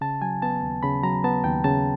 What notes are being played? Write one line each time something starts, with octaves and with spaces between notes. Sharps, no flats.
C#3 A5
F#3 G#5
B3 A5
D#2
C#3 B5
F#3 A#5
B3 A5
D#2 G5
C#3 A5